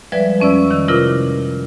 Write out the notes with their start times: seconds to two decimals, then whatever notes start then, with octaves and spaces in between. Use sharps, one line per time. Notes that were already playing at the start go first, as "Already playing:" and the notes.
0.12 F3 G3 G#3 B4 D5 E5
0.40 F2 C#4 D5 E6
0.71 D#3 E6
0.88 C3 E4 F4 A#4 D6